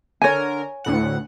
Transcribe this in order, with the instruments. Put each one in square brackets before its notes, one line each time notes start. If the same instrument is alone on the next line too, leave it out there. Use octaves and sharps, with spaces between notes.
[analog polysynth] D3 A#4 [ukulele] C#5 G#5
[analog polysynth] D2 A2 F#5